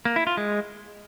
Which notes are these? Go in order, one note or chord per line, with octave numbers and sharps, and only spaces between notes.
A#3
E4
F4
G#3